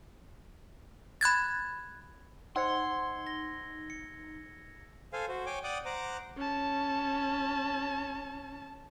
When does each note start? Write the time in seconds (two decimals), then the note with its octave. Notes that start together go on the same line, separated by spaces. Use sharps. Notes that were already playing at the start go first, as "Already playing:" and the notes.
1.21 B5 F#6 G#6 A6
2.56 D#4 C5 F#5 C6 E6 G#6 C#7
3.27 A#6 G7
3.90 C#7
5.13 A4 C5 F5 G#5
5.29 F#4 C5
5.46 C#5 G5 G#5 D6
5.63 D5 F#5 G5 D6 D#6
5.85 C5 F#5 A#5 D6
6.37 C#4 A5